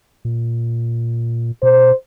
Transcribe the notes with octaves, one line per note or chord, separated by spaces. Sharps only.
A#2
B2 C5